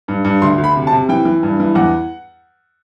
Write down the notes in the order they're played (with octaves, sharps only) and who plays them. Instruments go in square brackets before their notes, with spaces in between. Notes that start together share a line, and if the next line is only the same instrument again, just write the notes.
[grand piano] G2
G2
D2 C6
D2
B5
C3
A5
C3
E3 G5
E3
G2
E3
E2 F#5